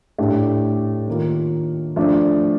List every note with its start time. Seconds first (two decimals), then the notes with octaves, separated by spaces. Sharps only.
0.18 A2 A3 D4 G4
1.08 D#3 A#3 F4
1.96 F3 A3 D4